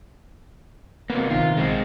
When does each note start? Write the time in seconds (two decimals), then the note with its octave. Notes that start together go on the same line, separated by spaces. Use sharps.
1.10 C3 A#3 B3
1.30 A#1 C3 D#3 F4
1.57 G#3 C4